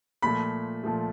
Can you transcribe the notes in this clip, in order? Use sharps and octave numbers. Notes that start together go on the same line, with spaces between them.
A#2 F3 A3 B5
A#2 F3 A3